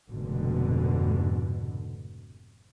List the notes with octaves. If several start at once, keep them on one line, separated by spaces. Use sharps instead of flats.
F1 G#2 B2 D3